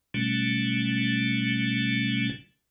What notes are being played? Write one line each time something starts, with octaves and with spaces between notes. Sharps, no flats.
B2 D3 F#3 G3 A3 C#4